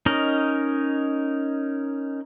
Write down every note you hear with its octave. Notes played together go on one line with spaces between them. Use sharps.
C#4 D#4 A#4 D#5